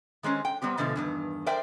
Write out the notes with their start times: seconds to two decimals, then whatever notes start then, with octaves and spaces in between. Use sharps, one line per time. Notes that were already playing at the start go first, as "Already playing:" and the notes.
0.23 D#3 G#3 C4 C#4
0.45 G5
0.62 G3 B3 C4 G4
0.77 G#2 B2 D3 F3 A3
0.96 E2 G2 D#3
1.46 A#4 C5 D5 E5 G5